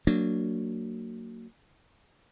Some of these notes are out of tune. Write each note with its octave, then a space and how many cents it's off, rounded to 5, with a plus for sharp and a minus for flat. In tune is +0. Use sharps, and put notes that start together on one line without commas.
F#3 +0 A#3 -25 D4 +0